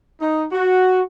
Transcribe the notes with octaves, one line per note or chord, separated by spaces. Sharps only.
D#4
F#4